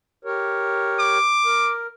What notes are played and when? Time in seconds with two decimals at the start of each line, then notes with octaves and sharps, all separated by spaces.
0.25 G4 A#4 C#5
0.99 D6
1.45 A#4